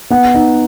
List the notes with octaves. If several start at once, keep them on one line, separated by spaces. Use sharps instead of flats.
B3 F#5
D#4